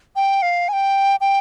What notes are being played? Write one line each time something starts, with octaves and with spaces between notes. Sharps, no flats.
G5
F5
G#5
G5
G5